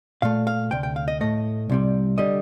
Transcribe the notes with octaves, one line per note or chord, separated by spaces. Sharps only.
A#2 A3 F5
F5
D2 C3 G5
G5
F5
D#5
A2 A3 D#5
C2 C3 G3
D3 G3 D#5